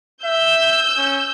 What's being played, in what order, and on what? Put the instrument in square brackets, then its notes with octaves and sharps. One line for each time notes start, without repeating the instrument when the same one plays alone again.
[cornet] E5 [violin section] E6 G6
[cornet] C#4